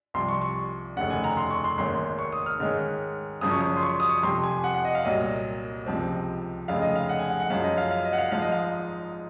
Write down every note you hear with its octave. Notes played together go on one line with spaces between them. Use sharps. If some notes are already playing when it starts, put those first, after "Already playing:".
C2 C3 F3 C6
C#6
C#6
F1 D#2 C#3 F#5
G#5
A#5
C6
C#6
C6
G#1 G#2 D#3 A#3 C#4 C6
C#6
D#6
F6
G#2 D#3 G#3 C#4
G#1 F#2 C#3 F3 D#6
C#6
D#6
C6
C#6
D#6
C#6
F2 C3 F3 C6
G#5
F#5
F#5
D#5
F5
C2 A#2 F#3 D#5
C#2 C3 F3 C4
F1 F2 C#3 G#3 F5
D#5
F5
F#5
G#5
F#5
F#5
F#2 F3 G#3 C#4 F5
D#5
F5
F5
D#5
F#5
F5
G#1 G#2 F3 F5
D#5
F5